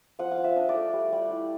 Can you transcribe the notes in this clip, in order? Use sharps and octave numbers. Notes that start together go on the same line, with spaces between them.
F3 F#5
F5
F4
E5
D4 D#5
D5
A3
G3
G3
E4